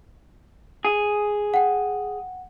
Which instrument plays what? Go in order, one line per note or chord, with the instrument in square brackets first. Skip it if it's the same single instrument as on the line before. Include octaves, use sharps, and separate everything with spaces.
[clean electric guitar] G#4
[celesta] F#5 G5